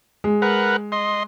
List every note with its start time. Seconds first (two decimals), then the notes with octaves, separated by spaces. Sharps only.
0.24 G#3
0.42 A#4 B4 F#5
0.92 D#5 C6